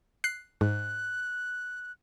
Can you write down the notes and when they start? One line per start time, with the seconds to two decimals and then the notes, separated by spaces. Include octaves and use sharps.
0.24 F#6 C7
0.61 G#2 F#6